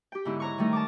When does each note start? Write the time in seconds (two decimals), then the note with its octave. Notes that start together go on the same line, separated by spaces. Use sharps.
0.12 G4 G5
0.25 G#2 D3 B3 E4
0.40 C#5 A#5 C#6
0.58 D#3 G3 A3 D#4 A#4
0.73 A5 A#5 D6